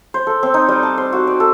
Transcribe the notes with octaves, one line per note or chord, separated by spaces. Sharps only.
C5
A4
C4
D#4
G3
A5
C5
F#4
D5
A4